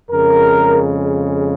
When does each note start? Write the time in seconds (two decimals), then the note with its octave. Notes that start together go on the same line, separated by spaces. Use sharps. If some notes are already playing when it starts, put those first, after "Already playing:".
0.11 F2 C#3 G#3 A#4